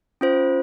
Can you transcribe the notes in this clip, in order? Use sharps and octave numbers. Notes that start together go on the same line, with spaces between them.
C#4 F4 C5